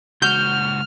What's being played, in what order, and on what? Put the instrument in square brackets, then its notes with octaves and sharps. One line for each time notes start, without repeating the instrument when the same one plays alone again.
[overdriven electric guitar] C#2 F#4 [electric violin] F6 [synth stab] G6